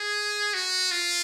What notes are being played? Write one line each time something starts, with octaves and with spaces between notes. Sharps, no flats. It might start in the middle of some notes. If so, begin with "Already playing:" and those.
Already playing: G#4
F#4
F4